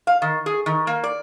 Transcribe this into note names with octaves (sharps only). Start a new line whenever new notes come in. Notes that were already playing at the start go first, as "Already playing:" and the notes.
F5
D#3
G#4
D#3
A#3
D5